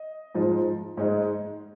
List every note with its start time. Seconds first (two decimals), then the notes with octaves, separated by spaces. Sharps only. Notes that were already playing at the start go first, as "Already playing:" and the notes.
Already playing: D#5
0.35 G#2 F3 G#3
0.97 G#2 G#3